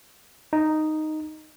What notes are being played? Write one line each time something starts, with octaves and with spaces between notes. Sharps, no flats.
D#4